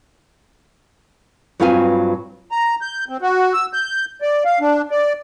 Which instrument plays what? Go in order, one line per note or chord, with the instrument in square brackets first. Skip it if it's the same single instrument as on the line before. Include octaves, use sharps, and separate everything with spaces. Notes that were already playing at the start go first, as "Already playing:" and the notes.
[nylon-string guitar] G2 F#3 C4 F4 B4 G#5
[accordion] A#5
G6
C4
F#4
E6
G6
D5
F5
D4
D5